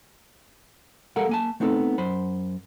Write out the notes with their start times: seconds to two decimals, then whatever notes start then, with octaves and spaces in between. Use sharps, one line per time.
1.16 G3 G#3 A4 A#4 F5 F#5
1.29 A#3 G#5 A5
1.60 A3 B3 C4 D#4 G4 A4
1.98 F#2 C5 B5